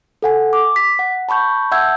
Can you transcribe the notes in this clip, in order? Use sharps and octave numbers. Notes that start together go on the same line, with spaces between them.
A4 F#5 G#5
D6
B6
F#5
A5 B5 C#6 G6
E5 F#5 A5 E6 G6 G#6